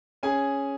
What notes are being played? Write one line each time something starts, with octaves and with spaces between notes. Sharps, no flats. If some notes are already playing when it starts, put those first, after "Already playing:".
C#4 G#4 G#5